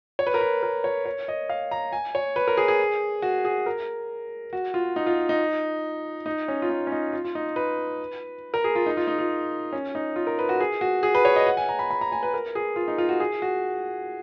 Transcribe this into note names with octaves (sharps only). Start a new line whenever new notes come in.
C#5
B4
A#4
B4
A#4
C#5
C#5
D#5
F5
A#5
G#5
C#5
B4
A#4
G#4
G#4
F#4
G#4
A#4
F#4
F4
D#4
F4
D#4
D#4
C#4
F4
D#4
C#4
D#4
F4
F4
D#4
B4
A#4
G#4
F4
D#4
F4
D#4
F4
C#4
D#4
F4
A#4
B4
F#4
G#4
F#4
G#4
B4
C#5
D#5
F#5
G#5
A#5
B5
B5
A#5
G#5
B4
A#4
G#4
F4
D#4
F4
F#4
G#4
F#4